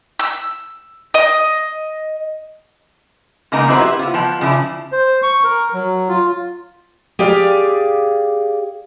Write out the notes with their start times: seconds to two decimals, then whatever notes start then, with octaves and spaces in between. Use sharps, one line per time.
0.20 E6
1.14 D#5
3.52 C#3 G#3 A#3 B3 D#4 A#4
3.67 F#3 C4 E4 F#4 B4 C5
3.81 E4 G4 C5
3.99 B3 F4
4.14 F3 B4 G5
4.41 C#3 F3 D4 E4
4.92 C5
5.23 C#6
5.44 A#4
5.74 F#3
6.09 F4
7.19 G4 G#4 D5 F5